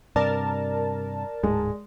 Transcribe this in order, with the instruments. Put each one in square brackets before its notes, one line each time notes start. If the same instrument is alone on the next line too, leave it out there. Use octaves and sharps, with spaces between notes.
[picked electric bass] G2 C3 [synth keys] A#4 A5 [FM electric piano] D5
[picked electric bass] D1 G#2 [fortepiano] G#3